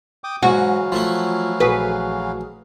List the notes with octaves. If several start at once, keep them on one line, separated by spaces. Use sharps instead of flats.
G5 D6 D#6
G#2 E3 F#3 F#4 F5 G#5
F3 A3 E4 F4
A#1 F#4 G#4 B4